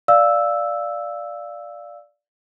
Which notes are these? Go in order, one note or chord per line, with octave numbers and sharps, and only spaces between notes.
D5 F5 E6